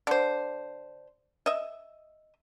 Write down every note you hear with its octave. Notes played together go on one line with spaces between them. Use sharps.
D3 C5
D#5 E5